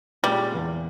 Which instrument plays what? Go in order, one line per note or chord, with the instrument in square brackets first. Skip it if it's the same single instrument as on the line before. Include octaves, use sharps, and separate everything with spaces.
[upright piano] A#2 G#3 C#4 F4 [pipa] G3
[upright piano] E2 E3 A#3